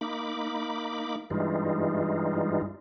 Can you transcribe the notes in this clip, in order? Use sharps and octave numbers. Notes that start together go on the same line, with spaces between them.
A#3 D#4 B5 D6
G2 E3 G3 G#3 D#4 F4